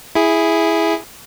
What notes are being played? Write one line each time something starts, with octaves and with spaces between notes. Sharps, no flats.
E4 G#4